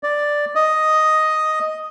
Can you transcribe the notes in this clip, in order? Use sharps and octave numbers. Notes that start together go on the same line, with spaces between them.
D5
D#5